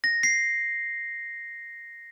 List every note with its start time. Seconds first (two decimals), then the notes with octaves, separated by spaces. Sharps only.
0.04 A#6
0.23 C7